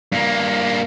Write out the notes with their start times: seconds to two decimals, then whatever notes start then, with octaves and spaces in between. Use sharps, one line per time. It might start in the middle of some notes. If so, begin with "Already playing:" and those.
0.12 G2 A#3